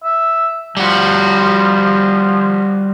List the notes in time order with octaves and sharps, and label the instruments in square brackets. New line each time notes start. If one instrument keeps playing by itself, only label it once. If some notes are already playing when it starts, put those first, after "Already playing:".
[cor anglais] E5
[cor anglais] F3 [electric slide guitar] G3 F#4